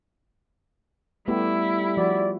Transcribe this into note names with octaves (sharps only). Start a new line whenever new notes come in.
G3 A3 B3 E4 G4
F3 F#4 D5